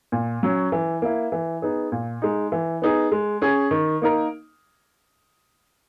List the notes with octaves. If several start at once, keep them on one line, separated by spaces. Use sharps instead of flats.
A#2
F#3 C#4
E3
A#3 E4
E3
B3 D#4 G#4
A#2
G#3 D#4
E3
B3 D#4 G#4
G#3
C#4 G#4
D#3
A#3 D#4 A#4